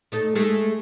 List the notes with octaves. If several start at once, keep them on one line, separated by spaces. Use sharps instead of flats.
A3 D#4 A4
G#3 A3 G#4